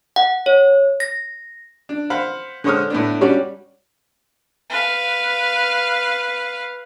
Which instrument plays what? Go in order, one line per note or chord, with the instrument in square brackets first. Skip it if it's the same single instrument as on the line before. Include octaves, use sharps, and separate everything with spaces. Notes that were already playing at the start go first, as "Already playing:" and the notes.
[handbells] F#5
C#5
A#6
[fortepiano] D4
C5 F5 F#5 B5
D3 G#3 C5 C#5 D#6 F6
A2 B3 D4
G3 C#4 D4 F#4 C#5 D5
[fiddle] B4 F5